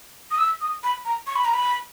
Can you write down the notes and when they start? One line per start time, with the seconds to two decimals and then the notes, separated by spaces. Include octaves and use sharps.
0.31 D#6
0.38 E6
0.61 D#6
0.84 B5
1.05 A#5
1.27 C#6
1.36 B5
1.45 A#5
1.54 B5